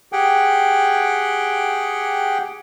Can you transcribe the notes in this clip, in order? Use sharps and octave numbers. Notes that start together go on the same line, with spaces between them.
G4 G#4 F#5 G5